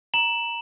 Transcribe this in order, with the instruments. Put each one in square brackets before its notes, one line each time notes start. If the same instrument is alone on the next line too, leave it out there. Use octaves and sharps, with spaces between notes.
[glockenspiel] A#5 E7 F#7